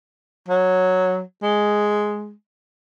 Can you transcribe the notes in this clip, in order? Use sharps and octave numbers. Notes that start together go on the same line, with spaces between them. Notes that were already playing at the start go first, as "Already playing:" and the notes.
F#3
G#3